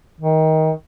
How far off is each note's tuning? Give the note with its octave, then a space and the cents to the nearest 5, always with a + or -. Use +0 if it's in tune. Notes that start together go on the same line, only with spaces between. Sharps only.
D#3 +20